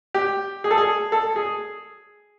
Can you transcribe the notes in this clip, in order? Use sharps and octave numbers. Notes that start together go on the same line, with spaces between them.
G4
G#4
A4
G#4
A4
G#4